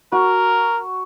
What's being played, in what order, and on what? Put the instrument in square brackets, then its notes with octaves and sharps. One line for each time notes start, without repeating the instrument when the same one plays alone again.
[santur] F#4 [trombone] A#4